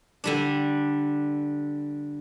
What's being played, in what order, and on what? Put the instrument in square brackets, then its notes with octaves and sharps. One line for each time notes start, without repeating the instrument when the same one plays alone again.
[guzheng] D3 G3 D4